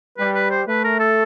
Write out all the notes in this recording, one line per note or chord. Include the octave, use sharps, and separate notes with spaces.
G3 B4
B4
C5
A3 B4
A#4
A4